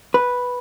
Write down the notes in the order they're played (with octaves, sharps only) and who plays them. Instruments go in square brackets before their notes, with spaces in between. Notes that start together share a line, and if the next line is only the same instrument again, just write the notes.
[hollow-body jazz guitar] B4